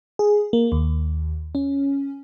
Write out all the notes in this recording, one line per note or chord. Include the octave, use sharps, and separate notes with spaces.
G#4
A#3
D#2
C#4